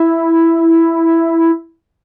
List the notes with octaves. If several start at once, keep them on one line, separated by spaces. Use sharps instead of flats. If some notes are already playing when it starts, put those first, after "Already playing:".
Already playing: E4